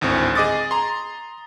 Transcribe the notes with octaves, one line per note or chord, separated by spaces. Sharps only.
G#1 D2 A2 C4
G#4 D#5 D6 D#6 A6
A#5 C6